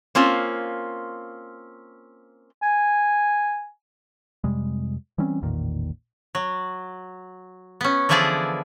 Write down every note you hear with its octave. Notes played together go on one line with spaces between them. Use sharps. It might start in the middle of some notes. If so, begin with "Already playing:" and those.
A#3 C4 C#4 F4
G#5
F2 C3 G3 G#3
E3 G3 C4 C#4
A1 E2 A#2 D#3
F#3
B3 C#4
D3 E3 F3 E4 G#4 D5